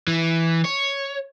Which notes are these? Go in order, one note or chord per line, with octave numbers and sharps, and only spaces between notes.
E3
C#5